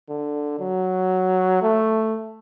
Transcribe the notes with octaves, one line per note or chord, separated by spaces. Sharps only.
D3
F#3
A3